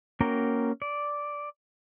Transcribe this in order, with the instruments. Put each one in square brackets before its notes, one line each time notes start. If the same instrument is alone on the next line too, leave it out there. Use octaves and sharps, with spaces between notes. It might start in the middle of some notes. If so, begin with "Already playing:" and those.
[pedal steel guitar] A#3 C#4 F#4 A#4 G5
D5